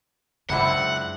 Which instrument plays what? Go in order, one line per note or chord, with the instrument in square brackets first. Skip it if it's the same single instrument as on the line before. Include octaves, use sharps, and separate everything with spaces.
[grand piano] C#2 [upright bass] F#2 [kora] D4 E4 C5 [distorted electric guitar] F#5